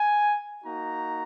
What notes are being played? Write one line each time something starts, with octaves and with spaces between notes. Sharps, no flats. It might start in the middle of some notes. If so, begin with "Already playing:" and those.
Already playing: G#5
A#3 D#4 F#4 A#5